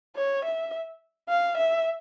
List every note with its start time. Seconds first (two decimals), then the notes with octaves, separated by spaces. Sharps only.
0.16 C#5
0.44 E5
1.29 F5
1.57 E5